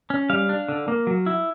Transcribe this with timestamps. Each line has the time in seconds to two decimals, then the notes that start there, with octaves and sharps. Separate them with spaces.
0.10 C#4
0.30 G3 F5
0.49 D4
0.69 D3
0.88 A#3
1.07 F#3
1.26 E4